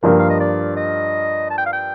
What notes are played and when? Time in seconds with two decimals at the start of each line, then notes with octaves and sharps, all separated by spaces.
0.03 G2 F3 A#3 A#4
0.19 F5
0.30 D#5
0.40 D5
0.77 D#5
1.50 A5
1.58 G5
1.66 F5
1.73 G5